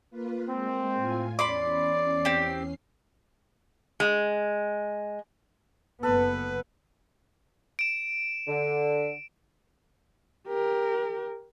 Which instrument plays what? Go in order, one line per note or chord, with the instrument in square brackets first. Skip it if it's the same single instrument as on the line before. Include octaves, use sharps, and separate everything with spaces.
[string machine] A#3 F4 B4
[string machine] G#3 A#3 [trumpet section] C4
[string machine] A2 F4 G#5
[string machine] E2 C#4 C7 [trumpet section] D5 [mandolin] B5 C6 D6
[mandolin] C4 G4
[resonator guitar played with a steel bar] G#3
[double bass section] F#1 B3 [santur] A4 [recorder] B4
[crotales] D7 E7
[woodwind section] D3
[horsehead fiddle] G4 A#4